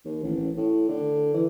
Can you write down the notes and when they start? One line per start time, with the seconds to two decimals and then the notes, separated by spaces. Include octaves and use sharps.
0.05 D#2
0.23 A1
0.37 A1
0.57 A2
0.89 D3
1.34 E3